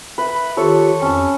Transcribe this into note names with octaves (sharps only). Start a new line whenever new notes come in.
B4 E5 B5
D#3 F4 G4 A4 C#5
F2 C#4 A5